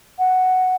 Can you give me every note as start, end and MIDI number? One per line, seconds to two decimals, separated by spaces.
0.19 0.76 78